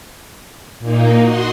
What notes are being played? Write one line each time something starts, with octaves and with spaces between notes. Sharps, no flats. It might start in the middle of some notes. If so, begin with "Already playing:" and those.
A#2 A#3 D#4
F#4 D#5 C6